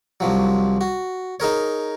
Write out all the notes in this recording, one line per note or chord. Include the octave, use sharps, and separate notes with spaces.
C2 F3 F#3
F#4
D#4 G#4 A#4 C#5